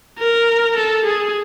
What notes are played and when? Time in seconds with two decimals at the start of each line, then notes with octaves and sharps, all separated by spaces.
0.18 A#4
0.77 A4
1.05 G#4